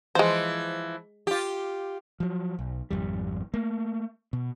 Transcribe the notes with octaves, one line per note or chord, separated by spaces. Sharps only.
E3 F3 G#3 C5
F4 G4
F3 F#3
B1
G#1 F2 G3
A3 A#3
B2